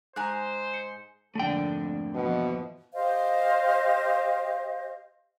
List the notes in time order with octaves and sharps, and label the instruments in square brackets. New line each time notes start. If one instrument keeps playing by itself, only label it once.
[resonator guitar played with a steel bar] G#2 G#3 G#5 [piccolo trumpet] C5 [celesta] A#5 F#6
[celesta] C#7
[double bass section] G#1 F2 A#3 [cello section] D3 [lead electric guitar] A3 G5
[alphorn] B2 [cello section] E3 F3
[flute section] G4 C5 D#5 F5